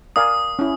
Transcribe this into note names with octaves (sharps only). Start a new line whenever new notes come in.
A#4 D5 F5 G#5 D#6
C#4 E4